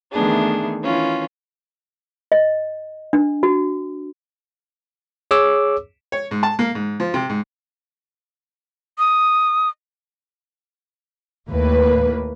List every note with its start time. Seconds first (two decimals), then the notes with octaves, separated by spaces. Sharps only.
0.13 D#3 E3 A3 B3 D4 G#4
0.84 D#3 E3 C#4 F4
2.32 D#5
3.13 D4
3.43 F#4
5.31 G#4 C#5 D6 E6
6.12 C#5
6.31 G#2
6.43 A5
6.59 A#3
6.75 G#2
7.00 F3
7.14 C3
7.29 G#2
8.99 D#6
11.50 D#2 A2 A#3 B4